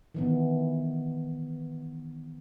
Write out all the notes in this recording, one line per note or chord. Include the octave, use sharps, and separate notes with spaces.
D#3 E3 B3